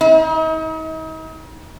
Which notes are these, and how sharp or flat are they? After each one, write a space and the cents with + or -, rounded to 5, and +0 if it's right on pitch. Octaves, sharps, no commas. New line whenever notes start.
D#4 +40